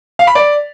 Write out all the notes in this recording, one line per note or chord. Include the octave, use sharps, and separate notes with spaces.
F5
B5
D5